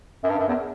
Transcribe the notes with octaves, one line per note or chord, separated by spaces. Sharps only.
F#2
G2
F#2
E2